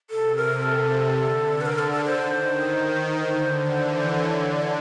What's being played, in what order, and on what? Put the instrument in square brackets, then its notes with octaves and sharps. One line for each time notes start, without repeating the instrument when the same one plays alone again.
[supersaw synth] C3 [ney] A4
[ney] A#4
A4
[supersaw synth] D3
[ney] B4
A#4
A4
A4
C5
[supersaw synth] D#3
[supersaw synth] D3 [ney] C5
[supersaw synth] E3
[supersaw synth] D3 [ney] C#5
[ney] D5
C#5